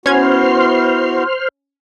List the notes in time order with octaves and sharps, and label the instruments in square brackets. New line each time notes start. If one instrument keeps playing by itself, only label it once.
[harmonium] B3 E4 F#4 [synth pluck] C#4 G#6 [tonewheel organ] C5 C6 F6